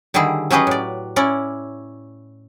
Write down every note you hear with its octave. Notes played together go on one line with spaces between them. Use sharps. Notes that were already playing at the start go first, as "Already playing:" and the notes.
D3 D#3 G3 E4 G#4
F#3 C#4 G4 G#4 B4 D#5
A2 D5
C#4 E4 D5